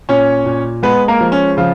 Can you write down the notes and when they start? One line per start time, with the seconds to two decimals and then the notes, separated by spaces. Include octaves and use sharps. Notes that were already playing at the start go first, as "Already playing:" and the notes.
0.09 A#2 C#4 C#5
0.46 A#2
0.83 G#3 B3 B4
1.08 A#3 A#4
1.21 F3
1.32 C#4
1.57 C#3 F3 F4